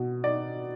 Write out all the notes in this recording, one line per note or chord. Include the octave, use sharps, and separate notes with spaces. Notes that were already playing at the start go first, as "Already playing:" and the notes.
Already playing: B2
D#4 D5